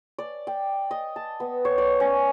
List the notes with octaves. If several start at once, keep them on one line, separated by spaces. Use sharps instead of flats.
D5
G5
D#5
A5
B3
C#5
D5
C#4